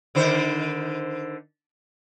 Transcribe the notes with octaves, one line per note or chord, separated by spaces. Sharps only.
D3 D#3 C5